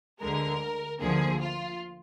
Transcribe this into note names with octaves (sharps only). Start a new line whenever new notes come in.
D2 D3 G#3 A#4
D2 D3 F3 A#3 G#4
F4